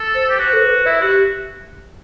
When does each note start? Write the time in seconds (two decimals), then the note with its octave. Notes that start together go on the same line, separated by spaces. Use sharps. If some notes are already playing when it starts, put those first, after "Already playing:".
Already playing: A4
0.15 C5
0.29 G4
0.38 F#4 C5
0.53 A4
0.62 B4
0.86 E4 E5
1.01 F#4 G4